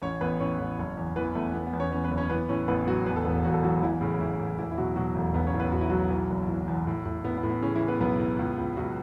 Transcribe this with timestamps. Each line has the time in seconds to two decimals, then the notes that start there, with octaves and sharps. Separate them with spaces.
0.02 A1 C#4 C#5
0.21 A1 B3 B4
0.39 A2 C#4 C#5
0.59 A1
0.79 F#1
0.97 E2
1.16 E3 B3 B4
1.35 E2 A3
1.54 E3 B3
1.67 B3
1.73 E2
1.80 C#4 C#5
1.92 E2 C#4 C#5
2.04 B3 B4
2.11 F#1
2.18 C#4 C#5
2.30 E3 B3 B4
2.49 A2 C#4 C#5
2.68 A1 B3 B4
2.87 A2 F#3 F#4
3.06 E2 B3 B4
3.16 A4
3.25 E1 B3 B4
3.45 E1 F#4
3.54 A4
3.63 E2 F#3 F#4
3.82 A1 E3 E4
4.01 A2 C#3 C#4
4.20 A1 E3 E4
4.39 A2
4.58 E1 E3 E4
4.72 E4
4.78 B2 F#3 F#4
4.96 B2 F#3 F#4
5.15 E1 A3
5.34 B1 B3
5.47 C#4 C#5
5.54 A2
5.60 B3 B4
5.72 A2 F#4
5.81 E4
5.90 B1 F#3 F#4
6.10 E3
6.30 F#1
6.48 E3
6.68 E2
6.87 A2
7.06 A2
7.24 A2 B3
7.38 B3
7.43 A2
7.50 B3
7.62 C#3 E3 C#4
7.75 E3 E4
7.81 A2
7.88 B3 B4
8.00 B1 B3 B4
8.20 A2
8.39 C#2
8.58 C#2
8.77 C#2 F#3 F#4